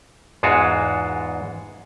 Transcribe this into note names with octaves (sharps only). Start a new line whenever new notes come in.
E2 G#2 G#3 F4 F#4 A5